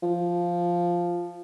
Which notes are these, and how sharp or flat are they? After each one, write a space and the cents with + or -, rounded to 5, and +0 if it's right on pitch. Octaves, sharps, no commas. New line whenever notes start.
F3 +0